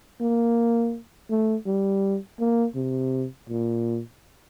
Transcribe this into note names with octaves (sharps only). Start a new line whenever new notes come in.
A#3
A3
G3
A#3
C3
A#2